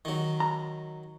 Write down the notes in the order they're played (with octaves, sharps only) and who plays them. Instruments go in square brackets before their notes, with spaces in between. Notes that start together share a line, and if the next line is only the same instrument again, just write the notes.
[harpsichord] D#3 F#3
[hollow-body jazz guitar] A#5